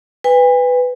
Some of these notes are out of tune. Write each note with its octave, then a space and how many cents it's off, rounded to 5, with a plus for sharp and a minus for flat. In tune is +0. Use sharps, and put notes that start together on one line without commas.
B4 +10 G#5 -45